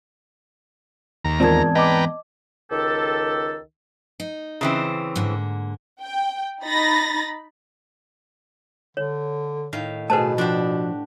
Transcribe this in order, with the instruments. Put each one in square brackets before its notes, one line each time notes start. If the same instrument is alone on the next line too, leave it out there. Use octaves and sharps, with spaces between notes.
[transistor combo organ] D#2 A#5
[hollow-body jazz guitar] E2 G#2 C4 [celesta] F4 A#4 [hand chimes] D5 A5 G#6
[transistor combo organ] B4 G5 A#5 [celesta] D#5 D6
[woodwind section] C#2 D#3 G4 A4
[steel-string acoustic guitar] D#4
[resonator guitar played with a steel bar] C#3 E3 C4
[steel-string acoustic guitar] G#2 D3 A#3
[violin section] G5
D#4 B5 A6 A#6
[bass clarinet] D3 [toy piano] C#5
[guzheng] A2 D#3 F5
[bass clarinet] B2 [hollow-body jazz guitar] A3 G#4 [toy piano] B4 C5 A5
[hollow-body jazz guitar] F3 [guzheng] D4 F#4 G4